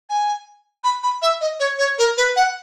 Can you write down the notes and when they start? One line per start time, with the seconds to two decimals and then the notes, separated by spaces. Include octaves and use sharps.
0.09 G#5
0.84 B5
1.03 B5
1.22 E5
1.41 D#5
1.60 C#5
1.78 C#5
1.98 A#4
2.17 B4
2.36 F#5